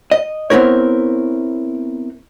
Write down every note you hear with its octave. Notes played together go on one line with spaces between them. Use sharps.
D#5
B3 C4 E4 A#4 C#5